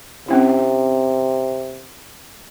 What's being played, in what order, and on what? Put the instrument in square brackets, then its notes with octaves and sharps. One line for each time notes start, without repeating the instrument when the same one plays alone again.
[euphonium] C3 [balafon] C4 C#4 E4